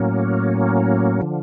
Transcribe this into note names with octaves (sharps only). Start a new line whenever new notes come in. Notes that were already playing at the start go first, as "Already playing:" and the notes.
Already playing: A2 F#3 A#3 C#4
D3 F3